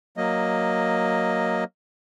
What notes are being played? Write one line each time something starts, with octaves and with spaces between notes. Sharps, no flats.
F#3 A#3 D#5